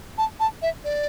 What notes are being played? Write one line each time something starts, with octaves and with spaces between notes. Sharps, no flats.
A5
A5
E5
D5